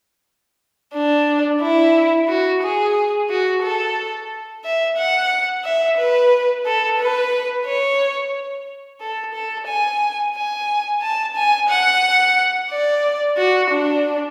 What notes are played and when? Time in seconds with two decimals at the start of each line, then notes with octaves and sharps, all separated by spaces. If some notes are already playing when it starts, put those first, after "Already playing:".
0.94 D4
1.62 E4
2.28 F#4
2.63 G#4
3.30 F#4
3.63 A4
4.64 E5
4.97 F#5
5.64 E5
5.98 B4
6.66 A4
6.99 B4
7.65 C#5
9.01 A4
9.34 A4
9.67 G#5
10.35 G#5
11.02 A5
11.36 G#5
11.69 F#5
12.70 D5
13.37 F#4
13.71 D4